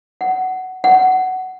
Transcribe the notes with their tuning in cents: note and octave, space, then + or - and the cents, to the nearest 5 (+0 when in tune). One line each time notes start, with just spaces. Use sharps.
F#5 +10
F#5 +10